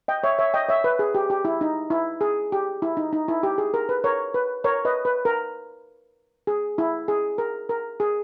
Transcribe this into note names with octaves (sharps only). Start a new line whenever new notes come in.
D#5 G5
C#5 E5
C#5 E5
D#5 G5
C#5 E5
B4
G#4
G4
G4
E4
D#4
E4
G#4
G4
E4
D#4
D#4
E4
G4
G#4
A#4
B4
A#4 C#5
B4
A#4 C#5
B4 D#5
B4
A#4
G#4
E4
G#4
A#4
A#4
G#4